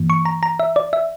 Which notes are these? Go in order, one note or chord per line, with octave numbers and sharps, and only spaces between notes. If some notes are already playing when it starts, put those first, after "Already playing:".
Already playing: G2 E3 A#3
C#6
A#5
A#5
E5
D5
E5